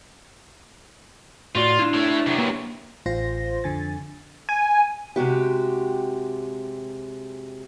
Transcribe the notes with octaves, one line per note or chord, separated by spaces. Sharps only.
A2 F4 F#4 D5
D4 E4
A3 C#5
C3 F#3
A#3 B4
A1 F4 C5 C6 A#6
F2 D3 G#5 A6
G#5
C3 G#3 F#4 G4